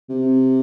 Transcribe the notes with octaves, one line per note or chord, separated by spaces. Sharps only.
C3